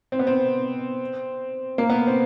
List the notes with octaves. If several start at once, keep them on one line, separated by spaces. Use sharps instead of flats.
C4
B3
C4
A#3
B3
C4